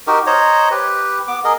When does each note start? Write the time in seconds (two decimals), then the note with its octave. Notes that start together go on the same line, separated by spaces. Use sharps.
0.07 D#4 F#4 G4 A#4
0.27 C5 C#5 D#5 A#5
0.71 G4 B4
1.28 B3 D6
1.44 G#4 A#4 D#5